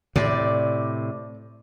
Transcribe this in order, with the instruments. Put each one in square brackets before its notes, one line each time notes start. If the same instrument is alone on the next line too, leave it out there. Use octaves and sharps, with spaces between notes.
[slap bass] A2 C3 [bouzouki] D5